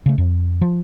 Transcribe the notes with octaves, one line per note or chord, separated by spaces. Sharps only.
C#3 A3
F2
F3